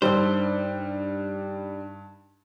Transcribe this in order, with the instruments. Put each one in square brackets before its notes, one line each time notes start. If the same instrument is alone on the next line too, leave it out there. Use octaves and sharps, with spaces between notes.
[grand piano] G2 D#3 [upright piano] G3 D4 [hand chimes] D#4 E6 [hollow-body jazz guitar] C5